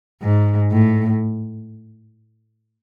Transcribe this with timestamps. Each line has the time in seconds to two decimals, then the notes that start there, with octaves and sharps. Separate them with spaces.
0.22 G#2
0.72 A2